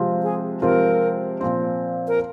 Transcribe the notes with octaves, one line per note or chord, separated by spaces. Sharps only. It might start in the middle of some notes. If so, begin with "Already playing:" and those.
Already playing: C3 F3 G#3 C4 F4
G#4
C3 F3 G#3 C4 F4 A#4
A#2 F3 C4
A#4